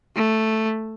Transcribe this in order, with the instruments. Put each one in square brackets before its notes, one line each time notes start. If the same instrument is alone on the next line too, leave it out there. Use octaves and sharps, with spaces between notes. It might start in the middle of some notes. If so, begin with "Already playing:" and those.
[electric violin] A3